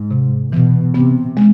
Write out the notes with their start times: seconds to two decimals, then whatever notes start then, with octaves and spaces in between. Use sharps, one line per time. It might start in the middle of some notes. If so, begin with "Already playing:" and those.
Already playing: G#2
0.11 C3
0.52 B2 E3
0.94 C3 B3
1.37 G#3